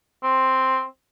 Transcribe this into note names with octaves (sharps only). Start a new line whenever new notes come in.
C4